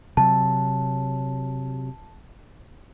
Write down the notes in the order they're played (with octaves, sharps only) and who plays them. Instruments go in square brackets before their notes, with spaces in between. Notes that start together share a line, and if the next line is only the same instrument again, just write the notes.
[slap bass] C3 F#3 [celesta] A5